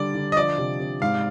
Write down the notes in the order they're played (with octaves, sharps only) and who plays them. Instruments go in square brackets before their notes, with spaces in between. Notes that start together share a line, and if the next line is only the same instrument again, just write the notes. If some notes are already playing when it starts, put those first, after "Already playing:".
Already playing: [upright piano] D3 G3 [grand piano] D5
[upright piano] D3
[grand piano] D#5
[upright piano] F3 [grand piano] D5
[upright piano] C3
C3
[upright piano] G#2 [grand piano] F5